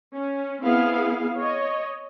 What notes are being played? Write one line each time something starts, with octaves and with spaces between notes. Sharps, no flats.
C#4
B3 C4 E4 G#4 F5
C#5 D#5